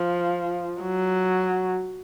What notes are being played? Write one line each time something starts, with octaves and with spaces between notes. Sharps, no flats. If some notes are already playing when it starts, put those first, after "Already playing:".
Already playing: F3
F#3